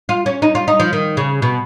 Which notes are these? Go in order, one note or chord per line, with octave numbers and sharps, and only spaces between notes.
F4
C#4
D#4
F4
D#4
F3
D#3
C#3
B2